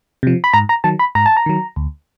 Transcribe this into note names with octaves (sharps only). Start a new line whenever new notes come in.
C3 F3
B5
G#2 A#5
A#5
D#3 F#3 A5
B5
G#2 A#5
A5
A#5
D#3 F#3
D2